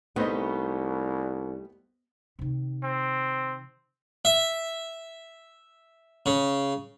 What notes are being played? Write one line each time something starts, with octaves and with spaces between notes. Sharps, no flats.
C2 G3 A3 B3 D#4 C5 D#5
C3 D#3
C4
E5
C#3